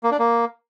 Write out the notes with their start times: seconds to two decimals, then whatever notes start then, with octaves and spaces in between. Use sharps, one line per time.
0.03 A#3
0.11 D4
0.19 A#3